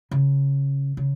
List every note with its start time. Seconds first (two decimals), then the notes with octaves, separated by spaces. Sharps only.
0.11 C#3
0.97 C#3